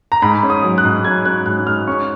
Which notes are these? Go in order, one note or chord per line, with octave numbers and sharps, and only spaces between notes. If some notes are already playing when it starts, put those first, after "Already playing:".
A#5
G#2 B5
C#4
D#6
F#3
F#6
G#2
F#3 G#6
C#4 F#6
G#2 F#6
G#2 F6
C#4 C#6